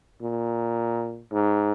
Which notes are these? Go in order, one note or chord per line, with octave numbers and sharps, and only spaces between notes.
A#2
G#2